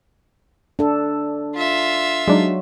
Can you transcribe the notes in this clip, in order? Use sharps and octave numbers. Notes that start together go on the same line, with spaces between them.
D4 A4
F4 E5
F#3 G#3 D4 D#4